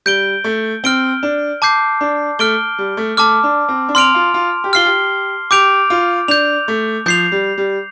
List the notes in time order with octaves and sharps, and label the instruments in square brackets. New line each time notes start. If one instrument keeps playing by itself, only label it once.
[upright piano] G3 [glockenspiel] G6 D7 G7
[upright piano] A3
[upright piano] C4 [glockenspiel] F6 D7 G7
[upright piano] D4
[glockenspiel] A5 D6 G6 C7
[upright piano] D4
[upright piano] A3 [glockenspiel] F6 D7 G7
[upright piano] G3
A3
[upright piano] A3 [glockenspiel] A5 D6 F6
[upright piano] D4
C4
D4
[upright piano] C4 [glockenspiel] C6 F6 D7 F7
[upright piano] F4
F4
G4
[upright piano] F4 [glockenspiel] F6 C7 G7
[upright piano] G4
[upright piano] G4 [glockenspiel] D6 G6 D7 F7
[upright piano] F4
[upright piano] D4 [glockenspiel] G6 F7
[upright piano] A3
[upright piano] F3 [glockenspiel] G6 C7 F7
[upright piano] G3
G3